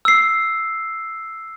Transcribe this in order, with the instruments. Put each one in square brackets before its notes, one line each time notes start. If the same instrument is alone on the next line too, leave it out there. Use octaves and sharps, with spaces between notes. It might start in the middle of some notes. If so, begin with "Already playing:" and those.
[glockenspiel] E6 C7